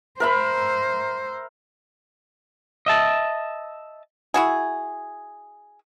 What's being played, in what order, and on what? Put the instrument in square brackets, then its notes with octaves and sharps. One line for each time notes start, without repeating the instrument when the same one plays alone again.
[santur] A#4 E5 B5 [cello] C5
[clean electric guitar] D#5 E5 A5
[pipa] E4 F#4 G#4